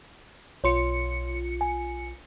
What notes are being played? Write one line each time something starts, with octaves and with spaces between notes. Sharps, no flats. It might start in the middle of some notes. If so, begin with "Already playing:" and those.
B1 F4 C#5 C6 C#7
G#5